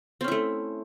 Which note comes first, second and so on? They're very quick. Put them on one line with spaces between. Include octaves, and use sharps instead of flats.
C4 C#4 E4 A3